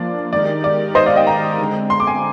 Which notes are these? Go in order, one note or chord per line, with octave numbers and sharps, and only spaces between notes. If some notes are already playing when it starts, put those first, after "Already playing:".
Already playing: F3 A#3 D4 F4 D5
D#3 G#3 D#4 G4 A#4 D5
D5
C5 D#5
D5 F5
D#5 G5
G5 A#5
D3 G#3 C4
C6
D6
G#5 C6